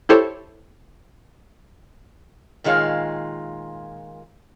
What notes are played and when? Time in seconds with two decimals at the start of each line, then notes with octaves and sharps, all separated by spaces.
0.09 E4 G4 A4 C5 C#5
2.64 A#2 D#3 G#3 F4 C#5 F5